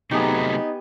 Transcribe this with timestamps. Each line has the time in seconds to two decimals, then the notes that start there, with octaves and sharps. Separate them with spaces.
0.11 C3 F#3 A3 B3 D#4 G4 G#4